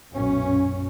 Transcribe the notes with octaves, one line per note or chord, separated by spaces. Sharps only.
B1 F#2 A#2 C#4